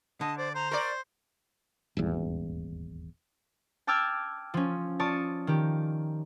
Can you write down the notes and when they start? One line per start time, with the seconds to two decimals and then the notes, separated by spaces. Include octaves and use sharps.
0.21 D3 D#5 A5
0.38 C5 D5
0.55 C5 A#5
0.71 A#4 D5 C#6
1.97 D#1 G#1 E2
3.87 G5 A5 D6 E6 F6 G#6
4.54 F3 C#4
4.99 F4 C#5 D5 A5 C#6 D#6
5.47 D#3 G4